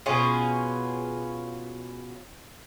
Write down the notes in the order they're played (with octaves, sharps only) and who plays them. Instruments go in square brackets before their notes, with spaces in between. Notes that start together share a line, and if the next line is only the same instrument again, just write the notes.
[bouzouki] B2 C#4 F4 G#4